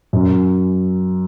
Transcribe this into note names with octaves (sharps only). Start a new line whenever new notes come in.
F#2